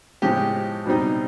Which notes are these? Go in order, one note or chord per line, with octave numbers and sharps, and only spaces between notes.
A2 F3 G#3 G4
B2 G3 C4 D#4